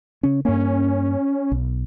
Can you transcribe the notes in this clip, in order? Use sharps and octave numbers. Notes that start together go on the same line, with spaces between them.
C#3 C#4
G2 A#3 C#4
B1